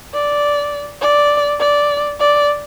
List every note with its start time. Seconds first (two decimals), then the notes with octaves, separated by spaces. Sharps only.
0.14 D5
1.01 D5
1.60 D5
2.20 D5